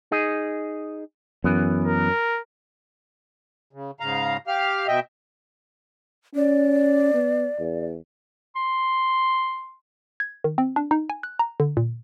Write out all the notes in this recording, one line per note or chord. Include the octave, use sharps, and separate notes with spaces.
D#4 G#4 D#5
F#2 E3 B3
A#4
C#3
G#2 C#3 F5 A#5
G4 F5 F6
B2 D#5 E5 G5
C#4 D5
B3
E2
C6
G#6
D#3
C4
D4
D#4
G#5
F#6
A#5
D3
A#2